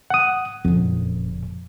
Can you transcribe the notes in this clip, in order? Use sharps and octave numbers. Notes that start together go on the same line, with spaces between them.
F#5 D#6
F#1 F2 A#2